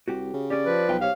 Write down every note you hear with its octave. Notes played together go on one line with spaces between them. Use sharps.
C2 F#4 G4
C#3
C#4 G4 D5
F3 B4
B1 F4 F5 G5
G4 C5 C#5 F5